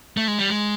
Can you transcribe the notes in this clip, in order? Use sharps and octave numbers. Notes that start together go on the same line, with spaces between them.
A3
G#3
G3
G#3